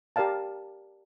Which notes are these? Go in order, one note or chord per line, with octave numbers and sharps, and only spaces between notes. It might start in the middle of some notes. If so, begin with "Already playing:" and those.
G4 A#4 D5 F5 A5